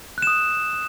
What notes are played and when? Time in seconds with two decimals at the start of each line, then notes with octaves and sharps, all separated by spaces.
0.18 F#6
0.22 E7
0.27 D#6